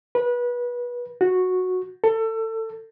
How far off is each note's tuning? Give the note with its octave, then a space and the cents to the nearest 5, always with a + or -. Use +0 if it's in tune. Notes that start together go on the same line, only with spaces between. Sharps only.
B4 -25
F#4 -10
A4 +25